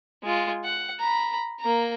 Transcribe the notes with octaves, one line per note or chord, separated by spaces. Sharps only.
G#3 F4
F#5
A#5 B5
A#3 A#5